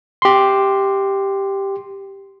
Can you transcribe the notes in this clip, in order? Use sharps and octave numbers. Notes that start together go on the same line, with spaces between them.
G4 C6